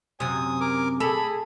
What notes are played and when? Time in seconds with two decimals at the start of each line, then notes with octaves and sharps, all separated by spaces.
0.20 F#2 C3 G#5 D#6
0.61 A#4 D6
1.00 G#4 A4 B5